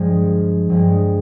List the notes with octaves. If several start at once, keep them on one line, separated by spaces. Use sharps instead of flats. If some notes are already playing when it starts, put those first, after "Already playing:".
Already playing: G2 F3 G#3
G2 F3 G#3